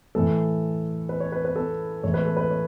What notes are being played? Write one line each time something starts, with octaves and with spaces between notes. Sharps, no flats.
A2 E3 A3 A4
B4
C#5
B4
B4
A4
A2 E3 G#3 C#5
B4
A4
B4
C#5